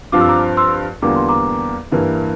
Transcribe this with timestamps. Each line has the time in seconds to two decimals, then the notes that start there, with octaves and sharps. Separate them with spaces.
0.12 G2 F3 C4 F4 D6
0.21 E6
0.29 A#5 D6
0.57 C6 E6
1.02 E2 D3 G3 A#3 F4 D6
1.16 C6
1.29 A#5 D6
1.92 G2 E3 A#3 E4